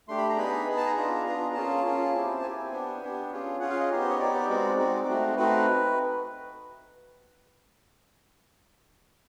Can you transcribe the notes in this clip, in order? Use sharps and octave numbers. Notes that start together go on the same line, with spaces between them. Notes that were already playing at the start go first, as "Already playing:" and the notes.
A3 D4 G4 C6
B5
A#5
B3 D#4 G#4 B5
B3 D#4 G#4
A5
A#5
B3 D4 F4 G#4
B3 D4 F4 G#4
A#3 C#4 F4 G#4 A5
A#3 C#4 F4 G#4
C4 E4 G4
C4 E4 G4 G#5
B3 D4 G4
B3 D4 G4
C#4 F4 G#4
C#4 F4 G#4 F#5
F5
D#5
B3 D#4 G4
C5
C#5
B3 D#4 G4 D5
G#3 C4 D#4 F#4
G#3 C4 D#4 F#4
A3 C4 D#4 F#4
A3 C4 D#4 F#4 B4